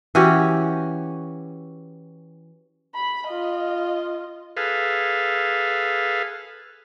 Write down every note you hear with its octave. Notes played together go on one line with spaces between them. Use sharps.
E3 C#4 F#4 G4
B5
F4 D#5
G#4 A4 B4 F5